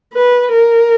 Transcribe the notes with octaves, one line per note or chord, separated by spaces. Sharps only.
B4
A#4